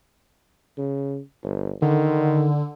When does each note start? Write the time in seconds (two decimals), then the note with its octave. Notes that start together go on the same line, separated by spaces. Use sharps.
0.78 C#3
1.43 G1
1.82 D3 D#3